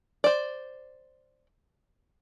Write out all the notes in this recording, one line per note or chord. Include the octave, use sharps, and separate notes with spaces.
C5 D5